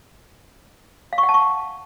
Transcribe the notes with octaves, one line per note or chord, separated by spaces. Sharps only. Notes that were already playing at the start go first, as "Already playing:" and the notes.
F5
C#6
F#5
A5
C#6